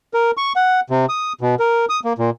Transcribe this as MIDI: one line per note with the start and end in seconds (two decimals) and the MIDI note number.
0.14 0.31 70
0.37 0.53 85
0.56 0.80 78
0.90 1.06 48
1.09 1.33 87
1.41 1.55 47
1.59 1.85 70
1.89 2.00 87
2.04 2.13 58
2.19 2.30 46